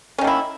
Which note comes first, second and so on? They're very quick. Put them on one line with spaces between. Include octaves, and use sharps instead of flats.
C#4 D#3 A#3 E4